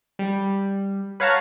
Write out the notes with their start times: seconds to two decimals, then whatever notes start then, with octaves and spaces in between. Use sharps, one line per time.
0.19 G3
1.20 B4 C#5 F5 F#5 A5 A#5